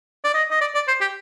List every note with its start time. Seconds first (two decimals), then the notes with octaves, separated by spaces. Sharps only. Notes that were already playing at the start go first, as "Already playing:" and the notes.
0.24 D5
0.34 D#5
0.51 D#5
0.61 D5
0.74 D5
0.88 C5
1.01 G4